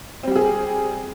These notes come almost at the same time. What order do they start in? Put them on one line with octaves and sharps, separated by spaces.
C4 G3 G4 G#4